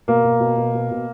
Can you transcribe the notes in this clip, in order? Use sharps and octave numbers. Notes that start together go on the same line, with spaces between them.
B2 A#3
B2
B2
B2
B2
B2